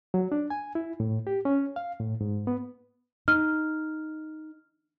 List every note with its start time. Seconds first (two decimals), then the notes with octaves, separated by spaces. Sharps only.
0.14 F#3
0.32 D4
0.50 G#5
0.75 E4
1.00 A2
1.27 G4
1.45 C#4
1.76 F5
2.00 A2
2.21 G#2
2.47 B3
3.28 D#4 F6